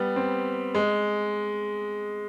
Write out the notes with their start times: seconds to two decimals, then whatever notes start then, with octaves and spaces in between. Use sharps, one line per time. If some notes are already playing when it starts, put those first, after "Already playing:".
Already playing: G3 B3
0.16 C4
0.75 G#3